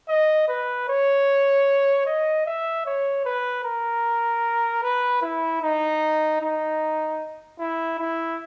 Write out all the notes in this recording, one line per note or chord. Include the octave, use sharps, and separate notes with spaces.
D#5
B4
C#5
D#5
E5
C#5
B4
A#4
B4
E4
D#4
D#4
E4
E4